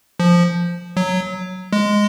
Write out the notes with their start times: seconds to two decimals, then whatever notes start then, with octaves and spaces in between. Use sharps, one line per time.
0.20 F3
0.97 F#3
1.73 G#3